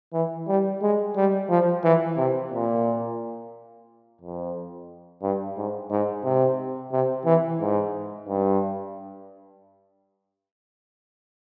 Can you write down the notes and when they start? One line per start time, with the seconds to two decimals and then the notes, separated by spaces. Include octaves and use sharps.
0.13 E3
0.48 G3
0.82 G#3
1.16 G3
1.49 F3
1.83 E3
2.17 C3
2.52 A#2
4.21 F2
5.22 G2
5.57 G#2
5.91 G#2
6.24 C3
6.92 C3
7.25 E3
7.60 G#2
8.28 G2